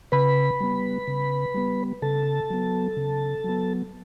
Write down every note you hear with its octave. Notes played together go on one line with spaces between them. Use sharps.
C#3 B4 B5
G3 B3
C#3
G3 B3
C#3 A4 A5
F#3 B3
C#3
F#3 B3